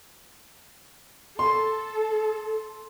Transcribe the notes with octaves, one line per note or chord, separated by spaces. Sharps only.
A4 C6